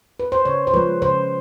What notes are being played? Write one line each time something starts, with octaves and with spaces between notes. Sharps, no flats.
B4
C5
C#3 C#5
C5
F3 G#3 B4
C#3 C5